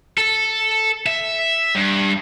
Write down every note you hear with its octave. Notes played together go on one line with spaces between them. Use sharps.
A4
E5
G2